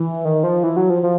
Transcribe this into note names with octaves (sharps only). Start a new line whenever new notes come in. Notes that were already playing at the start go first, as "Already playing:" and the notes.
Already playing: E3
D#3
F3
E3
F#3
F3
F3